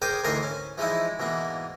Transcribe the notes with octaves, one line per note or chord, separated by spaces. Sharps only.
G#4 A#4 C5 D5 G5 D#6
D2 G#2 E3 A#4 D#5 C6
C#4
E3 F3 G#3 D#4 E4
G#2 B2 E3 A#3